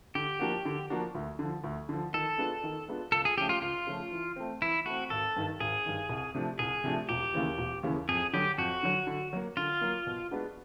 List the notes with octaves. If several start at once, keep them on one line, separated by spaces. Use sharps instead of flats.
D3 G4
F3 A#3 D4 F#4
D3
F3 A#3 D4 F#4
D2
D3 F3
D2
D3 F3
D#3 A4
G#3 B3 D4 F4
D#3
G#3 B3 D4 F4
C#2 A4
G#4
C#3 F3 A3 C#4 G4
F4
C#2 F4
C#3 F3 A3 C#4
E3
A3 C4
E3 E4
A3 C4 F#4
G#1 A4
G2 D#3
G#1 G#4
G2 D#3
C2
C3 F3 A3 D4
C2 G#4
C3 F3 A3 D4
E1 G4
D#2 C#3 E3
E1
D#2 C#3 E3
F2 G#4
D3 F#3 G4
F2 F#4
D3 F#3
D3
F#3 A#3
D3 F4
F#3 A#3
B2
G#3 B3 D4 F#4